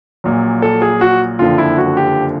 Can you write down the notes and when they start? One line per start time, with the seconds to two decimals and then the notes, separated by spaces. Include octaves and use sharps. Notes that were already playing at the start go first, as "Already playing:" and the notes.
0.24 A#1 A#2 F#3
0.62 A4
0.82 G#4
1.01 F#4
1.39 F#1 F2 D3 F3 F4
1.58 E4
1.78 F#4
1.97 G4